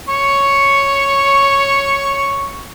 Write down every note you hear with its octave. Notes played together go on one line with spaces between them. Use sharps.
C#5 C#6